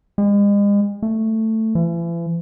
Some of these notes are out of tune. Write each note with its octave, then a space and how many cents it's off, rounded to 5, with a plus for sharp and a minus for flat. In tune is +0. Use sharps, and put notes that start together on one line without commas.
G#3 -40
A3 +10
E3 +40